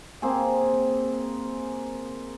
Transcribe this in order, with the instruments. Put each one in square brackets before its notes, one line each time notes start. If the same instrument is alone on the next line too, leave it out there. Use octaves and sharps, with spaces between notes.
[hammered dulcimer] A#3 C4 G#4